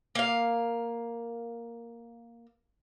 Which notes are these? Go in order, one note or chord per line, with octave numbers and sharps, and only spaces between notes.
A#3 F5